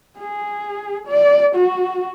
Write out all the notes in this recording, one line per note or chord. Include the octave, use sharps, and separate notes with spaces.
G#4
D5
F#4